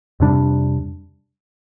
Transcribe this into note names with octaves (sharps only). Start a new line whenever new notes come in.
F2 C3 G3 D4